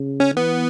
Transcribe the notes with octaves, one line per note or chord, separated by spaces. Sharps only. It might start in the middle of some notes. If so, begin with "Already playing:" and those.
Already playing: C#3
C#4
E3 B3